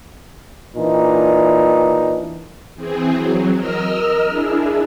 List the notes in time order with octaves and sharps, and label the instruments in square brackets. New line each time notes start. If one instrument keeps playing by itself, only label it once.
[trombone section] A#2 E3 D4 D#4
[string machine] E3 C4 G#4
F#3
A#4 D#5 E6 F6
D4 E4 G#4